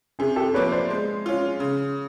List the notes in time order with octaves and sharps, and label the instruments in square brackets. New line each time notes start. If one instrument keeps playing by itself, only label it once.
[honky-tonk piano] C3 [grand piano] G#4
[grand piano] G4 A4
[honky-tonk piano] F3 A#3 D4 [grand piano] B4 C#5
[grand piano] C5 D5
[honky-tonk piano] G#3
C#4 F4
C#3